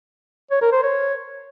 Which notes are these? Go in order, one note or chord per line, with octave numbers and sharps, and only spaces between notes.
C#5
A#4
C5
C#5